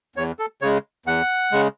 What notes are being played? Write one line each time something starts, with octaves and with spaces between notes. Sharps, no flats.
E2 C#5
A4
C#3 G#3 C#5
E2 F#5
C#3 G#3